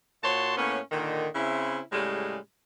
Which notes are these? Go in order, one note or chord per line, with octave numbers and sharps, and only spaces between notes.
A#2 F#4 C#5 A5 C6
A2 A#3 B3 C#4
A#2 D3 D#3
C#3 C4 E4
A2 C#3 G3 G#3